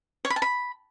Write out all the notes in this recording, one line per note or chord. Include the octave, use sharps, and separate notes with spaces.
C#5
B5
A5
B5